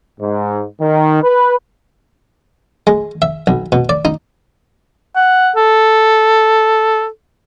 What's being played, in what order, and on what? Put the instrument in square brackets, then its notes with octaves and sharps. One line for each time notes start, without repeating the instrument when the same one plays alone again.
[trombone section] G#2
D#3
B4
[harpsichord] G#3
E5
B1
B2
D5
D#4
[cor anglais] F#5
A4